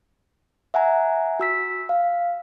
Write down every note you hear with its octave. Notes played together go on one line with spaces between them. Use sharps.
E5 F#5 G#5 A#5
F#4 E6 B6
F5